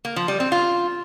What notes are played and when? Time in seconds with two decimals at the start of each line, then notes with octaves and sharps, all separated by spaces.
0.05 A#3
0.16 F3
0.28 G3
0.40 C4
0.52 F4